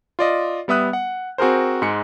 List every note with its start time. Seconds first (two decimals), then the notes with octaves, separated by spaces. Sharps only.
0.19 F4 D5 D#5
0.68 G3 B3 E5 D#6 F#6
0.93 F#5
1.38 C4 F#4 G#4 A#4 C5
1.82 G#2 G#3 C#7